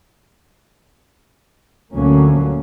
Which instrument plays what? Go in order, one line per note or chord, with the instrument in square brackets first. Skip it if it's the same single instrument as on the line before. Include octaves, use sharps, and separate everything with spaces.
[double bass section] D2 A#2 D3 F#3 A#3 C#4